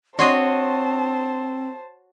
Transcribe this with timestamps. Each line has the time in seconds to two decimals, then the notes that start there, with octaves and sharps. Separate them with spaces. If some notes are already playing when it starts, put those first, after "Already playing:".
0.19 C4 D4 F#4 C5 C#5 D#5 A5 C6